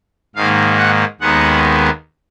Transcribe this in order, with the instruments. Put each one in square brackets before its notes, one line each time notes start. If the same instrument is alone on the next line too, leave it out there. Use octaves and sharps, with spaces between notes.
[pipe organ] G#2 D#3 A#3 F5
F#5
D#2 D#3 G#3 B3 F#5